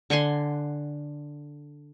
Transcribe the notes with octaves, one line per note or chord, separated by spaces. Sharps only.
D3 F#5 G#5 C6